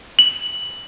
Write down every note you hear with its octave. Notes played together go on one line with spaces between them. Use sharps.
F#7